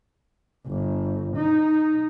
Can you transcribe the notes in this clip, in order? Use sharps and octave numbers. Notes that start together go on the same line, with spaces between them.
G1
D#4